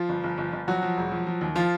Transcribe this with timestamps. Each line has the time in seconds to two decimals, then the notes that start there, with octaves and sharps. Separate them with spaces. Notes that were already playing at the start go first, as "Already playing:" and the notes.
Already playing: F3 F4
0.09 G1
0.24 G1
0.38 G1
0.53 G1
0.68 F3 F#3 F#4
0.82 F3
0.97 E1
1.12 F3
1.27 F3
1.41 D#2
1.55 F3 F4